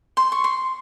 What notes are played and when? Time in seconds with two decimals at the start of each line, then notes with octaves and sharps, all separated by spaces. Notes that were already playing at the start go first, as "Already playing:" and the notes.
0.17 C6
0.32 C#6
0.44 C6